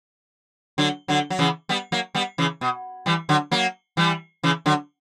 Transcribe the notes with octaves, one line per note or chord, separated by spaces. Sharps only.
D3 F#3
D3 F#3
F#3
C#3 E3
G3 B3
F#3 A#3
G3 B3
C#3 E3
B2
E3 G3
D3 F#3
F#3 A#3
E3 G3
C#3 E3
D3 F#3